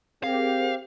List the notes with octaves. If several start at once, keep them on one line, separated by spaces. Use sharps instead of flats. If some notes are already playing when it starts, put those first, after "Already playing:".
C4 G4 G#4 A#4 C5 F5